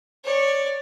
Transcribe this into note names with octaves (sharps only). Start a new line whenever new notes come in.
C#5 D5